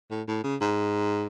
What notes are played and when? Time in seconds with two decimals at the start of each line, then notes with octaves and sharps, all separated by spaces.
0.10 A2
0.27 A2
0.44 C#3
0.61 G#2